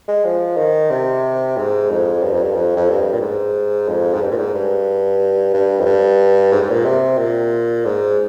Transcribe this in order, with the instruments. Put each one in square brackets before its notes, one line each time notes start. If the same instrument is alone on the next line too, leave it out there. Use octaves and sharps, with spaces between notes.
[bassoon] G#3
F3
D#3
C3
G#2
F2
G2
F2
G2
F2
F2
G2
A#2
G#2
F2
G#2
G2
A#2
G#2
G2
G2
F2
G2
G#2
G#2
A#2
C3
A#2
G#2